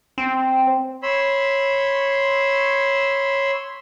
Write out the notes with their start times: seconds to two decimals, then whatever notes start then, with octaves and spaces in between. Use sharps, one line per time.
0.18 C4
1.03 C#5 B5 C6 E6